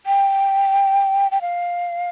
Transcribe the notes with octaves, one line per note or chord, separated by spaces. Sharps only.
G5
G5
F5